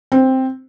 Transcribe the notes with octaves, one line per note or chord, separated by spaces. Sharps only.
C4